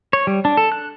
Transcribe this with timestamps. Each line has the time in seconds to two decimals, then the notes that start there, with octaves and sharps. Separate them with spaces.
0.13 C#5
0.27 G3
0.45 D4
0.57 A4
0.72 F#6